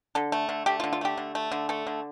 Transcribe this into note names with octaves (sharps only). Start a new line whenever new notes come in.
D3 A4
A3
D3
A3 G4
F4
D3
F4
A3 G4
D3
A3
D3
A3 A4
D3